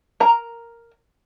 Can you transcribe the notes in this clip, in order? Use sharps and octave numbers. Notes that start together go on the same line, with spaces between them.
A#4 A#5